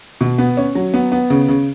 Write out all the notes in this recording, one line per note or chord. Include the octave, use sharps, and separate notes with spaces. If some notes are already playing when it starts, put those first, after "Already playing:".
B2
B3
C#4
F#3
B3
B3
C#3
C#3